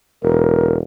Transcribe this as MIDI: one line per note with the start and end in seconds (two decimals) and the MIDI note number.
0.23 0.82 28
0.23 0.76 70